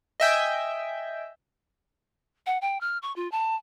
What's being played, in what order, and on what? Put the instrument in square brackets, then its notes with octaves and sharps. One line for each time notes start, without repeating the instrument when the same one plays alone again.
[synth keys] D#5 E5 G5 G#5
[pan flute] F#5
G5
F6
C#6
F4
A5